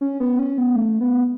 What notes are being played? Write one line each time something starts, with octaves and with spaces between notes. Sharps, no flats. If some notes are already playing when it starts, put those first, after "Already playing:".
C#4
B3
C#4
B3
A3
B3